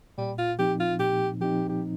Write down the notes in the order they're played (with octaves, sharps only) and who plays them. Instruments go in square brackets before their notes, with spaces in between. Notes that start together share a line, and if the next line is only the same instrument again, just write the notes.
[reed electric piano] A#2 [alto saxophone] G3
[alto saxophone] F4
[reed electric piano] F3 C4 D#4 [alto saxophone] G4
[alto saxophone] F4
[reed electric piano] A#2 [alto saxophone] G4
[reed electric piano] F3 C4 D#4 [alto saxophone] G4
[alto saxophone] G4